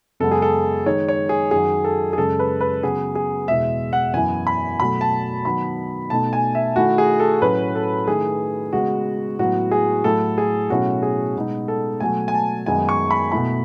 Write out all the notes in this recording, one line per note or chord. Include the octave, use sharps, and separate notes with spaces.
F#2 C#3 G#3 B3 A4
G#4
A4
D#3 G#3 D#4 C#5
C#5
G#4
F#2 D#3 F#3 G#4
A4
G#4
F#2 C#3 G#3 C#4 A4
B4
B4
C#3 F#3 B3 G#4
G#4
E2 B2 G#3 E5
F#5
F#2 E3 B3 E4 G#5
B5
B2 F#3 A3 B5
A5
D#3 F#3 B3 B5
B2 A3 D#4 A5
G#5
E5
D#3 A3 E4 F#4
G#4
A4
A2 F#3 C#4 B4
A4
D#3 A3 E4 G#4
C#3 G#3 B3 F#4
A2 F#3 B3 F#4
G#4
A2 F#3 A3 E4 A4
G#4
B2 F#3 A3 C#4 E4 F#4
G#4
B2 G#3 B3 D#4
A4
B2 F#3 A3 G#5
G#5
A5
F#2 D#3 G#3 B3 D#4 G#5
C#6
B5
B2 A3 E4 B5